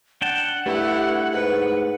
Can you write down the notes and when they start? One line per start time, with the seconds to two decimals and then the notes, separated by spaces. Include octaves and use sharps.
0.22 D4 F#5 G5 A5
0.66 G2 A3 E4 G4
1.33 G#2 B4